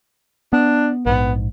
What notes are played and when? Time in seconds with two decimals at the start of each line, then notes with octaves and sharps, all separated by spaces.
0.53 B3 D4
1.06 A#1 G#2 B3